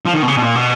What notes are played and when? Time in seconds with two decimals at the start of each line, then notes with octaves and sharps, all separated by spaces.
0.06 F3
0.14 D#3
0.22 B2
0.28 C#3
0.37 B2
0.42 A#2
0.55 B2